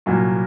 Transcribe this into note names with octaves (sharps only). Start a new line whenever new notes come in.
C2 A#2 F#3 F#4